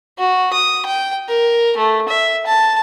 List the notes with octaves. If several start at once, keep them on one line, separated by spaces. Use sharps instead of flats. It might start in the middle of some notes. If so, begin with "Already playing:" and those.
F#4
D#6
G5
A#4
A3
E5
A5